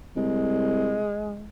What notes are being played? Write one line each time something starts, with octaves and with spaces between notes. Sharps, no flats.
C2 G#3